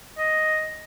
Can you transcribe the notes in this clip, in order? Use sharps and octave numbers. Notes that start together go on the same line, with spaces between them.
D#5